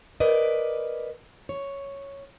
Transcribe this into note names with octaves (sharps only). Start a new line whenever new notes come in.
A#4 B4 D5 D#5
C#5